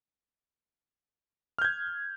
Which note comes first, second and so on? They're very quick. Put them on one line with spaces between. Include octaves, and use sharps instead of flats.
F6 G6 G#6